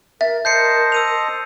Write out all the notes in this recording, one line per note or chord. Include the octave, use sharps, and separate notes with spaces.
A#4 E5 A6
A#4 C5 D#5 A5 G6 C7 C#7
E6 D#7 F7